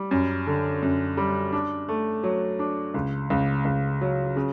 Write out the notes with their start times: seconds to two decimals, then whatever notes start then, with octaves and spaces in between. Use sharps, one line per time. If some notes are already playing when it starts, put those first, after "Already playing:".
Already playing: G3
0.11 F#2
0.47 D3
0.82 F#2
1.17 G3
1.52 D4
1.89 A3
2.23 F#3
2.59 D4
2.94 C#2
3.30 C#2
3.65 C#2
4.01 F#3
4.36 C#3